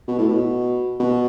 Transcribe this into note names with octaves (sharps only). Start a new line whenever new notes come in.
B2
A2
B2
B2